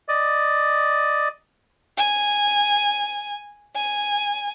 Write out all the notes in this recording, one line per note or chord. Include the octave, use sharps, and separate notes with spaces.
D5 D#5
G#5
G#5